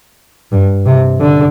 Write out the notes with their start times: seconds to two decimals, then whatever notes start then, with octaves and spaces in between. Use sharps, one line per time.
0.52 G2
0.86 C3
1.20 D3